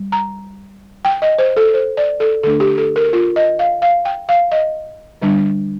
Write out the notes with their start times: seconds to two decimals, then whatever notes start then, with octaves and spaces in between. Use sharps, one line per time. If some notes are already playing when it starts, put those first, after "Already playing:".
Already playing: G3
0.12 A#5
1.05 G5
1.22 D#5
1.38 C5
1.57 A4
1.74 C5
1.97 D5
2.20 A4
2.43 D3 A3 D4 A4
2.60 G4
2.78 A4
2.96 A#4
3.13 F4
3.36 D#5
3.59 F5
3.82 F5
4.05 G5
4.29 F5
4.52 D#5
5.22 D3 G3 D4